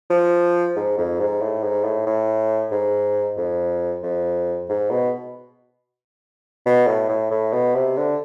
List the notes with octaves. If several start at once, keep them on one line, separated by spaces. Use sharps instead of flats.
F3
G#2
F2
G#2
A2
G#2
A2
A2
G#2
F2
F2
G#2
B2
B2
A2
A2
A2
B2
C3
D3